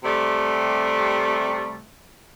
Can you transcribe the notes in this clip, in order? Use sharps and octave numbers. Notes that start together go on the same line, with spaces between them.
C3 G3 A3